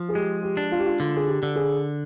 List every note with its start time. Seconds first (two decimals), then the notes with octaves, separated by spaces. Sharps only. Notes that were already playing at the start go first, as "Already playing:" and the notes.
Already playing: F3
0.09 G#4
0.15 G#3 G4
0.43 G4
0.57 D4
0.72 F4
0.79 G4
0.86 F4
1.00 D3 F4
1.16 G#4
1.27 G4
1.43 D3
1.56 G#4